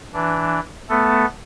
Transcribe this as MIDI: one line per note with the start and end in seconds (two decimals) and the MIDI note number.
0.14 0.60 52
0.14 0.60 62
0.89 1.25 57
0.89 1.25 59
0.89 1.25 69